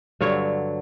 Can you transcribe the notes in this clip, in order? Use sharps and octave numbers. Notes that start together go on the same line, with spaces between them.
G2 D3 F#3 C#5